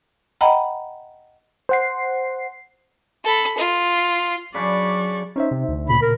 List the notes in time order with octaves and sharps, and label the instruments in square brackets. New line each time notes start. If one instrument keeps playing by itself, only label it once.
[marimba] D#5 F#5 G5 A#5 B5
[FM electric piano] C5 F#5 C7
[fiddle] A4 B5
F4
[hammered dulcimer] C#3 D4 B5 [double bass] F#3 [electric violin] D5 C#6
[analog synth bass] C#4 [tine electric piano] D#4 C5 E5
[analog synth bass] C3
D2
[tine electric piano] A#2 C#3 [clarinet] B5
[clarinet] A#4